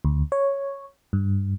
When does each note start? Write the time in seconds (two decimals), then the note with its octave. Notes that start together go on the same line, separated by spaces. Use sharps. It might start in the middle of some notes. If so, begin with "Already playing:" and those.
0.05 D2
0.32 C#5
1.13 G2